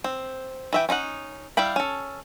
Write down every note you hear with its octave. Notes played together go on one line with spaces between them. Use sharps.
C4
E3 E5 G5
C#4 D#4 F4 F#5
G3 E4 F5 G5 B5
C#4 A4